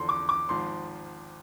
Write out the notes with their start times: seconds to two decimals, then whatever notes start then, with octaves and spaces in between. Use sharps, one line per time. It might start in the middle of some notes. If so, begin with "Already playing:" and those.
Already playing: E2 D3 F3 C6
0.09 D6
0.29 D6
0.49 G#1 G#2 F3 C6